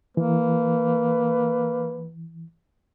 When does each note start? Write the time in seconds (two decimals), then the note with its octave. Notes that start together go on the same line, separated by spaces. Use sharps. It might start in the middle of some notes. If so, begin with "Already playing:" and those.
0.17 E3 A#3 B4